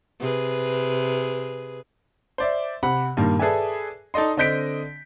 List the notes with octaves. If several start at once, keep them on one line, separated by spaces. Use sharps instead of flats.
C3 G#4 B4
C5 D5 E5
C3 F#5 B5
G2 A#2 D#3
G#4 A4 B4 D5 E5 G#5
D#4 A4 D5 D#5 C6
D3 C4 D#5 G6 B6 D7